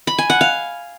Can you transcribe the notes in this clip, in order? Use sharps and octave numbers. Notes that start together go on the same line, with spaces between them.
B5
G#5
F#5
F5